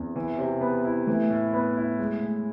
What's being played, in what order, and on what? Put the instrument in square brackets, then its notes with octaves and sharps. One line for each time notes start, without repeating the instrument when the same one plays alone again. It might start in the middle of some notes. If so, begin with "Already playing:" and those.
Already playing: [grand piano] E2 [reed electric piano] C4
[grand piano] E3
C3
B3
E4
[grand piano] E3 [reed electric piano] A3
[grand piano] A2
B3
E4
G#3
A2